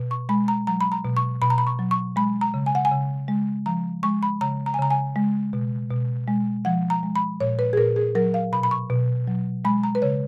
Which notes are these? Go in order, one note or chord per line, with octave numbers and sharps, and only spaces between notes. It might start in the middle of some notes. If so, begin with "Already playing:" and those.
Already playing: B2
C#6
G#3 B5
A#5
F#3 A#5
B5
A#5
B2
C#6
B2 B5
A#5
B5
C#6
F#3
C#6
G#3 B5
A#5
C#3
G#5
F#5
G#5
C#3
G#3
F3 A#5
G#3 C#6
B5
C#3 A#5
A#5
G#5
C#3 A#5
G#5
G#3
B2
B2
G#3
F3 F#5
A#5
G#3
B5
A#2 C#5
B4
G#4
A#2 A#4
G#4
F#3 A#4
F5
B2 B5
B5
C#6
B2
F#3
G#3 B5
A#5
B4
C#3 C#5